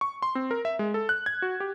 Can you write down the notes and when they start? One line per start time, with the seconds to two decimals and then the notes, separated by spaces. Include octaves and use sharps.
0.01 C#6
0.22 C6
0.35 C4
0.51 A#4
0.65 E5
0.79 G#3
0.94 A4
1.09 F#6
1.26 G#6
1.42 F#4
1.60 G4